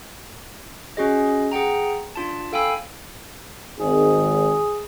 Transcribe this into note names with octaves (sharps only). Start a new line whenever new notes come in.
C#4 F#4 G#4 D#5
G#4 F#5 G5 A#5
D4 F4 A5
A4 F5 G5 G#5 B5 E6
G#1 G#4